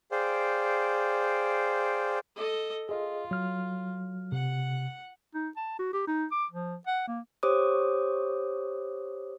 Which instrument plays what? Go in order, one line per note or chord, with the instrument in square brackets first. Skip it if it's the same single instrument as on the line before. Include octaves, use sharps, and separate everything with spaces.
[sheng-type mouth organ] G#4 C5 D5 F5 G5
[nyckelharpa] A4 D#5
[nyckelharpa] F4 [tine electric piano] G#4 D#5
[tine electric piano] F#3 F6
[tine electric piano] C3 [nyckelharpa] F#5
[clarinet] D#4
A5
F#4
G4
D#4
D6
F3
F#5
A#3
[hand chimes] G4 C5 C#5 D6 D#6